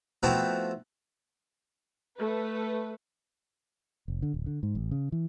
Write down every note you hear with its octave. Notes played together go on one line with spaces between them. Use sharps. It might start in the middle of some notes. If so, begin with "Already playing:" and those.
F3 A3 B3 C4 E4 F#4
A3 B4
F1
D3
D1
D3
G#2
A1
C#3
E3